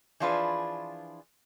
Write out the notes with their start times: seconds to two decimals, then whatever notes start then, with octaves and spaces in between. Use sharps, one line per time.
0.20 E3 F3 D4 F4 G#4 B4